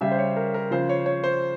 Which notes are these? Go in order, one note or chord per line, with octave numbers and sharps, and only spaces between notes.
C#3 G3 E5
C5
C#5
A#4
A#4
C#3 F3 C5
C#5
C#5
C5